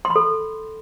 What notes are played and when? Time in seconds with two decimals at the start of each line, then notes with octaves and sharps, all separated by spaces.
0.05 C6
0.10 B5
0.16 A4